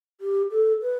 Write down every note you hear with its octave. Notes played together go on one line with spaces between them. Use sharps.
G4
A4
B4